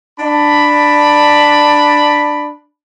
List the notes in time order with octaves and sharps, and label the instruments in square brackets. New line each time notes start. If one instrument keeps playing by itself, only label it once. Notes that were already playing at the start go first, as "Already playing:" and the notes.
[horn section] D4 B5